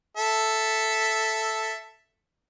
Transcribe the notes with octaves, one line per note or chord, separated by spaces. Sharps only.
A4 E5